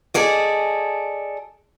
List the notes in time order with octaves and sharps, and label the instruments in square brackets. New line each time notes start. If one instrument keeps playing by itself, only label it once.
[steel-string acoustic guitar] G#4 A4 D5 D#5